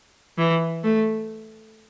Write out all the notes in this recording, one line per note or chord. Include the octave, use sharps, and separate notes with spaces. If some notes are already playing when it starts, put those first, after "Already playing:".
E3
A3